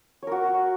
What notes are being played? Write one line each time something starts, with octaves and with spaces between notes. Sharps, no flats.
F#4 A#4 C#5